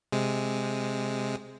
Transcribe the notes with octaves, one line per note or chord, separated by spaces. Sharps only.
C3 G#3